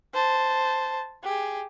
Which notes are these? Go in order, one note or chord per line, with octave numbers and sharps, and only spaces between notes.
C5 A5
G4 G#4